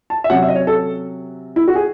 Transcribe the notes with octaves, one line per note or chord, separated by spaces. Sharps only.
A5
E5
C3 F#3 C#4 F#5
E5
D#5
C#5
A4
E4
F#4
G#4